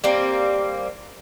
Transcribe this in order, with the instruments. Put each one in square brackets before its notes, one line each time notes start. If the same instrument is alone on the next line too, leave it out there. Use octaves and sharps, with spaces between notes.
[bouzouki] G3 A#3 C4